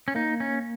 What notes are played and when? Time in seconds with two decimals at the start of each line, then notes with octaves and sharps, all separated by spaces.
0.08 C#4
0.15 A#3 D#4
0.40 C#4